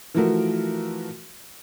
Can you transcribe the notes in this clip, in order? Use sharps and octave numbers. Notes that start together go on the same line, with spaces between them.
E3 F3 A3 F#4 A#4